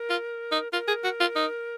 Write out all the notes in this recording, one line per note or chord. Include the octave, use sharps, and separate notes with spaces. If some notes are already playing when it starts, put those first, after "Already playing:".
Already playing: A#4
F4
D#4
F4 A#4
G#4
F#4
F4
D#4